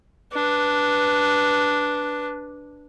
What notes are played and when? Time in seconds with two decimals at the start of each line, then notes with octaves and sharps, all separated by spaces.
0.32 D4 B4